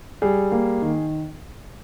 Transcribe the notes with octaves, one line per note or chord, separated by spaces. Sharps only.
G3 G#4
A#3
D#3